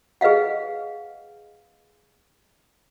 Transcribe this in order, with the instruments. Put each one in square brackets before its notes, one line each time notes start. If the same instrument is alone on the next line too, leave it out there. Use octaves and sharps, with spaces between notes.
[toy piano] G#4 B4 D#5 F5 F#5